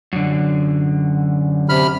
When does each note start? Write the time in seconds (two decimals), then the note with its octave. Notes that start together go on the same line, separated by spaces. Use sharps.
0.13 F#2 D3
1.69 C3 B5 F6